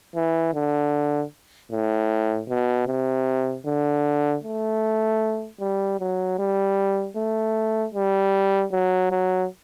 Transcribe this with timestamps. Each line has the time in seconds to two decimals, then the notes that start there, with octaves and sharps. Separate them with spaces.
0.15 E3
0.54 D3
1.71 A2
2.49 B2
2.87 C3
3.66 D3
4.44 A3
5.60 G3
6.00 F#3
6.39 G3
7.16 A3
7.94 G3
8.72 F#3
9.11 F#3